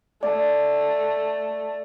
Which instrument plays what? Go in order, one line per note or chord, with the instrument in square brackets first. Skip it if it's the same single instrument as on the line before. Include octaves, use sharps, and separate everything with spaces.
[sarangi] A3 [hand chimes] D5